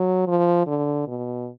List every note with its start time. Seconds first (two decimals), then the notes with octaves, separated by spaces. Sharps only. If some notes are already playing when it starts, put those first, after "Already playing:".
Already playing: F#3
0.27 F3
0.67 D3
1.07 B2